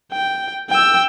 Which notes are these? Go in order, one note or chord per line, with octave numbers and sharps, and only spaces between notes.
G5
G5 E6